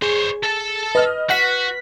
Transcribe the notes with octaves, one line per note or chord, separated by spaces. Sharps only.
G#4 C5 C#5
A4 A5
B4 D#5 F6
F#4 F#5 F#6 B6